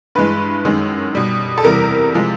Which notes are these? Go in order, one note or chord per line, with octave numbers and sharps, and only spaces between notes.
G2 E3 G#3 B4
F#2 D#3 G#3
B2 G3
A4
E2 C3 E3 G3 A#4
C3 F3 G#3